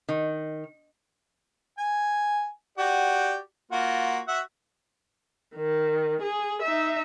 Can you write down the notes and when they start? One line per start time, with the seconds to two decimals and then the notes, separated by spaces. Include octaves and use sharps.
0.09 D#3
1.78 G#5
2.78 F#4 G4 D5
3.72 A#3 F4 F#4
4.28 F#4 E5 F#5
5.56 D#3
6.22 G#4
6.62 D#4 E5